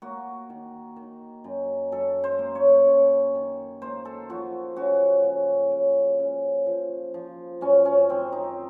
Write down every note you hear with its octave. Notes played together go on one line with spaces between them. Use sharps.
A#3 F#4
D#3
D#3
F#2
F#2 A4
C5
A#3
C#5
F#2
D#3
A#3 C5
A4
F3 F#4
C#3 F#4
C#3
C#3
C#3
F3
F3
F#2 C#4
C#4
D#3 C4
D#4